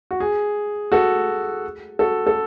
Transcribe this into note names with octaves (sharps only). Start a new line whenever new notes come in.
F#4
G#4
F#4 A4
F#4 A4
A4